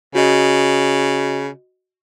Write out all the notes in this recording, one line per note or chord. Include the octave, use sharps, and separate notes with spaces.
C#3 F#4 D#5